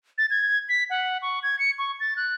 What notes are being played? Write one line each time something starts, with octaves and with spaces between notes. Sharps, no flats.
A6
G#6
B6
F#5
C#6
G#6
C#7
C#6
A6
F#6